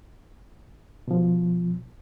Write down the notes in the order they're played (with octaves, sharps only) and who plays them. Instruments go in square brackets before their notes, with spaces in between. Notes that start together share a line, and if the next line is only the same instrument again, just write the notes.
[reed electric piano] B2 F3